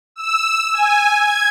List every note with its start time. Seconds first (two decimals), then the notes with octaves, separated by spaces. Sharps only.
0.16 E6
0.73 G#5
1.17 G#6